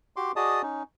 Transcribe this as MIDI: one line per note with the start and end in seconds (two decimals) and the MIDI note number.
0.16 0.32 66
0.16 0.32 67
0.16 0.32 84
0.16 0.32 86
0.36 0.62 66
0.36 0.62 68
0.36 0.62 74
0.36 0.62 75
0.36 0.62 81
0.36 0.62 87
0.63 0.83 61
0.63 0.83 63